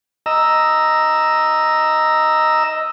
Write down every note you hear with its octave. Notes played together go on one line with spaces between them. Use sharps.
D#5 A#5 E6